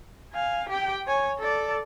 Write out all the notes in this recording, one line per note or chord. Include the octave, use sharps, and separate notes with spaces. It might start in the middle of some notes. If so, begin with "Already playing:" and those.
F5 G#5
G4 G5
C#5 G#5
A4 D5